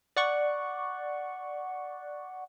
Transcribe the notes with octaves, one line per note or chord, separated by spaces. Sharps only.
D5 F#5 C#6